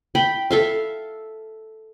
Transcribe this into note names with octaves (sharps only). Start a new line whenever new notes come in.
G5 B5
A4 E5 F5